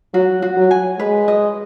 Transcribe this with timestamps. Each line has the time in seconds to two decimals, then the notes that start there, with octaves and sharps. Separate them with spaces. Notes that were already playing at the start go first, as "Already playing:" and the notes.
0.14 F#3 F#4
0.42 F#4
0.57 F#3
0.71 G#5
0.99 G#3 B4
1.28 D#5